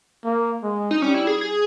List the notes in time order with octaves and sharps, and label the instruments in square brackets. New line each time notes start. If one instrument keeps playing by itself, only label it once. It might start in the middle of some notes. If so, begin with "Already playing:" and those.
[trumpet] A#3
G#3
[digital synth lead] D#4
[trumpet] G3 [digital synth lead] C#4
[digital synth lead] E4
G#4
G#4